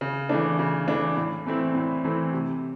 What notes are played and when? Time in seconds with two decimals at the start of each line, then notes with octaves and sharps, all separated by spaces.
0.01 C#3
0.29 E3 A3 D4
0.59 C#3
0.88 E3 A3 D4
1.17 A2
1.46 E3 A3 C4 E4
1.75 A2
2.04 E3 A3 C4 E4
2.33 C3